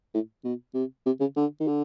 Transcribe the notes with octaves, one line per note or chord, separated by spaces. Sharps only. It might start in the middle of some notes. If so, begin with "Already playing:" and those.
A2
B2
C3
C3
C#3
D3
D#3
D3